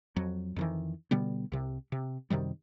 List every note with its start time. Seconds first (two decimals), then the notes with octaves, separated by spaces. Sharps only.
0.16 F2 F#3
0.56 F2 D#3 E3
1.11 B2 D3 G3 B3
1.52 C2 C3
1.92 C3
2.30 F#2 C3 D#3 G3